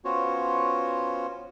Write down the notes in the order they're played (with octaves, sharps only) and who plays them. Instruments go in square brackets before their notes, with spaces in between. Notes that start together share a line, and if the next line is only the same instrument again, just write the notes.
[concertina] B3 C#4 F4 F#4 C5 C#5